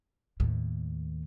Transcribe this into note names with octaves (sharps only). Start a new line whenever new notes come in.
D#2 A2